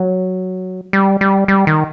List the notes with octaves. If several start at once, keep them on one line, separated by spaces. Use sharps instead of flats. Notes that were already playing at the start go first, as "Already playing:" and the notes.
Already playing: F#3
G3
G3
G3
D#3